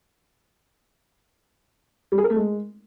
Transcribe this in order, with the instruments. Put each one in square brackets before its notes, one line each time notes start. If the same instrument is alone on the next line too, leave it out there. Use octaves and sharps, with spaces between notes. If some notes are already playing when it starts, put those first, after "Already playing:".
[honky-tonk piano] G3
G#4
A#4
A3
G#3